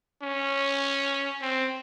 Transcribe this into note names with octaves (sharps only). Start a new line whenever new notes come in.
C#4
C4